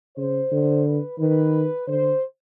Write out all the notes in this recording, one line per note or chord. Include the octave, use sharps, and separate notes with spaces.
C#3 C5
D3
B4
D#3 B4
D3 C5